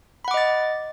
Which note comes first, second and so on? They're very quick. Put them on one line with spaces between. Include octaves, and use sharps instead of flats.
B5 F#5 D6 D#5 A6